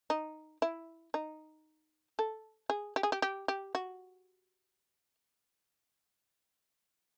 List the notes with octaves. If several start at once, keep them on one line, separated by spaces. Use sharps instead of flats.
D#4
E4
D#4
A4
G#4
G4
G#4
G4
G4
G4
F#4